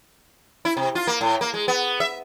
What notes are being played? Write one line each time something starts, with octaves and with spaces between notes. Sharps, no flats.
E4
C3
F4
A#3
A2
A#3
G#3
B3
E5